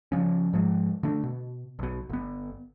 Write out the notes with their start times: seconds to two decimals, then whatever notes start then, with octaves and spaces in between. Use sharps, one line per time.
0.12 C#3 F3 C#4
0.53 G#2 F3 G#3
1.03 D3 A3 D4
1.23 B2
1.79 B1 B2
2.09 G1 B3